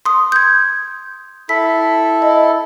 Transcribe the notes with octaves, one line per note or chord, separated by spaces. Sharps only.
C6 D#6
G6 G#6
E4 A4 B6
D#5